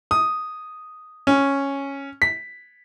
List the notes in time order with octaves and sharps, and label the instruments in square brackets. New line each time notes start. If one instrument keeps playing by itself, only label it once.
[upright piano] D#6
C#4
B6